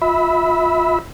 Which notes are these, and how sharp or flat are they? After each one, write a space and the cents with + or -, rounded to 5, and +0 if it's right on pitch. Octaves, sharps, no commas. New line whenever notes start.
F4 +20 E5 -20 B5 +0